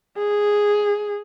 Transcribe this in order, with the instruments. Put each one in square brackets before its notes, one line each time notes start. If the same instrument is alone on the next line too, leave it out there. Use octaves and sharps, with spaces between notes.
[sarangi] G#4